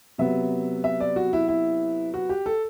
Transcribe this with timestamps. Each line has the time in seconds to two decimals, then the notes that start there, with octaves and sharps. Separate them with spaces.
0.18 C3 F#3 B3 E5
0.84 E5
1.00 D5
1.16 F#4
1.33 E4
1.48 E4
2.14 F#4
2.29 G4
2.46 A4